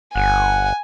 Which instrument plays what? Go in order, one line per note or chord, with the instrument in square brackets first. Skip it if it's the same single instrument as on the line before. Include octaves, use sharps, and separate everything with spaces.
[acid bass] G1 [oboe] F#5 [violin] G#5